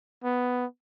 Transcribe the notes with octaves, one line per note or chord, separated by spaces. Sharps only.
B3